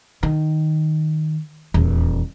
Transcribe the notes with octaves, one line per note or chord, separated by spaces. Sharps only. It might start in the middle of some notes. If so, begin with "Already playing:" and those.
D#3
D#1 E2